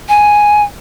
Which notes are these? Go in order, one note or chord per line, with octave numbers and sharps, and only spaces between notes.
G#5